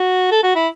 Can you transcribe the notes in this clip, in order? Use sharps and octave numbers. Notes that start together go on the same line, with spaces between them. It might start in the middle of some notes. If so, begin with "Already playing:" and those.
Already playing: F#4
A4
F#4
E4